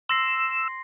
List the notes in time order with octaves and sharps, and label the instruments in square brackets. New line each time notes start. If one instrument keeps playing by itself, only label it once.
[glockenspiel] C6 A#6 C7 [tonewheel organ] E6